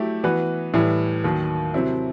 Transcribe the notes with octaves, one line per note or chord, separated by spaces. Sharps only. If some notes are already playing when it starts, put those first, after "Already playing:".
Already playing: F#3 A3 E4 G4
E3 B3 F#4 B4
A2 E3 G3
D#2 D#3 F#3
C3 F#3 C4 E4